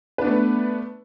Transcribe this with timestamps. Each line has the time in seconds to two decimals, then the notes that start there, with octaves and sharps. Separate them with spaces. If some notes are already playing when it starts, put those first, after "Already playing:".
0.18 B4
0.21 D4
0.24 B3
0.27 A3